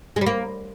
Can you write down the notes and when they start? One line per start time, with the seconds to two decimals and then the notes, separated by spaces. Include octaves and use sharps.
0.16 G#3
0.21 G3
0.26 A#3